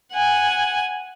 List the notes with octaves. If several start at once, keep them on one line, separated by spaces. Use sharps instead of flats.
F#5 G#5